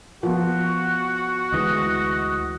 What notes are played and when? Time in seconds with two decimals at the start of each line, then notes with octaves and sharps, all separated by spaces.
0.23 F3 B3 F#4
1.52 D2 E3 G#3 D#5